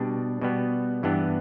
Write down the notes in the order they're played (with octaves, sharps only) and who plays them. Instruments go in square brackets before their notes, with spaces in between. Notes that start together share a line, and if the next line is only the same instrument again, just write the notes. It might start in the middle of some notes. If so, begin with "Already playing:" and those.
Already playing: [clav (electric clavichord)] B2 G3 D4
B2 G3 B3
G2 E3 B3 D4